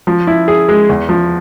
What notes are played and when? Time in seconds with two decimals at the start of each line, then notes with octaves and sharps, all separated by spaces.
0.07 F3
0.27 E4
0.48 G#4
0.69 G#3
0.89 E2
1.09 F3